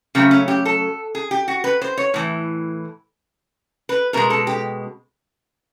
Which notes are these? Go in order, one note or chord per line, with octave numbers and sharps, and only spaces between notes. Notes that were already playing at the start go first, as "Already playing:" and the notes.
C#3 F#3 A3 C4
C#4
G4
A4
G#4
G4
F#4
B4
C5
C#5
A2 E3
B4
B2 G#3 A#4
A4
G4